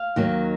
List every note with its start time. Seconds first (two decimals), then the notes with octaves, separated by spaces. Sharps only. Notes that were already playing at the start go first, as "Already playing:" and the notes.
Already playing: F5
0.16 D#2 D#3 F#3 A#3